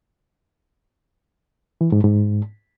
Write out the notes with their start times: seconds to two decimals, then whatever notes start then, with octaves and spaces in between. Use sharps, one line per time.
1.81 E3
1.92 G#2
2.04 G#2